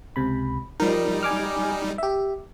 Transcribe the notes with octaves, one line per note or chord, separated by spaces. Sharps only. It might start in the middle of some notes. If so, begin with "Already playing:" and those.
C#2 C3 B5
F3 G3 D#4 A#4
G#5 D6 F6
G4 E5